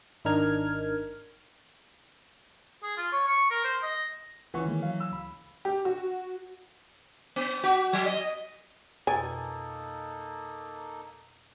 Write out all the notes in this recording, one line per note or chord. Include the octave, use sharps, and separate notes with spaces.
G#1 D4 D#4 A#4 F6 G#6
G#4
F4
C#5
C#6
A#4
C5
D#5
C#2 E3 C#4 F#5 C#6
D#3 G#3 A#3
F#3 F5
E6
C#2 B5
G4
F#4
B3
F#4
F#3
D#5
F2 B2 A#3 D#4 A4 G#5 A6